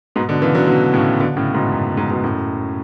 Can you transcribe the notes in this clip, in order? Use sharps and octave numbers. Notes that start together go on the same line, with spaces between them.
G#2 B2
B2 D3
C#3 E3
D3 F#3
B2 D3
A2 C#3
B2 D3
A2 C#3
G#2 B2
F#2
G#2
G#2 B2
F#2 A2